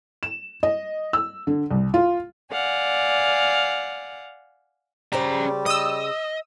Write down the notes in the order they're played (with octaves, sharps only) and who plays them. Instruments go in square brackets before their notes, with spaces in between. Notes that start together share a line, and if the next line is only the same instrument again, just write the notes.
[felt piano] E7
D#5
E6
D3
C2
F4
[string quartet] D5 F5 F#5 G#5
[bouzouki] C#3 C5 D5 [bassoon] G3 [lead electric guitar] C#4 A#5
[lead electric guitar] D#5 [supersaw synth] D#6 E6